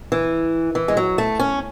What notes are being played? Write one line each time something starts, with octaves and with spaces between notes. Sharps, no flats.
E3
E3
G#3
F#3
A3
C#4